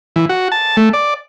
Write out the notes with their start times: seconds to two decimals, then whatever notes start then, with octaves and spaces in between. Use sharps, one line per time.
0.16 E3
0.29 F#4
0.52 A5
0.77 A3
0.93 D5